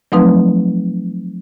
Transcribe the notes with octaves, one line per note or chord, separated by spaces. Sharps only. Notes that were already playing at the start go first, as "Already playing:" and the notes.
F3 F#3 A3 C4 D#4 B4